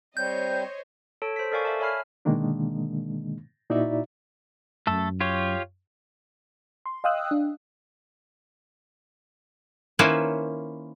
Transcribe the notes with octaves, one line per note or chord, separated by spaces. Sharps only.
G3 C4 C5 C#5 D#5 G6
A4 C#5 A5
C5 B6
A4 A#4 D5 F5 G#5 C#6
E5 A5
C#5 E5 G#5 B5 F6 C7
B2 D3 D#3 G#3 A#3 D4
A#2 D#4 E4 F#4 D5 E5
F#2 A3 A4
F4 G4 C#5
C6
D#5 F5 G5 D#6 E6 F#6
D4
D#3 A#3 C#4 E4 B4 C5